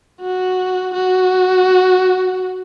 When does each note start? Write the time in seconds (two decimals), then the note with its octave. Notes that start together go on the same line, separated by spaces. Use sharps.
0.21 F#4
0.94 F#4